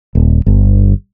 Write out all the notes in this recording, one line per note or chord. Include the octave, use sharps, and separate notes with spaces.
D#1
G1